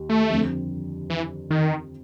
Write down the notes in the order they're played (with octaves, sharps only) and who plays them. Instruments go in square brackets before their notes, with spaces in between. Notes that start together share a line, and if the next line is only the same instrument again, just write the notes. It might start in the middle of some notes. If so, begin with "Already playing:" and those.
Already playing: [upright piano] D#2
[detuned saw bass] A3
[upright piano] F2 D3 G3 C4
[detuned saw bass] E3
D#3